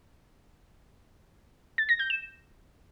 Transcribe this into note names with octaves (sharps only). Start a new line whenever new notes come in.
A6
A#6
G6
E7